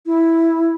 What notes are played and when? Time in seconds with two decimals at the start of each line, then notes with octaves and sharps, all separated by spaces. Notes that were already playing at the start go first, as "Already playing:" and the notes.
0.06 E4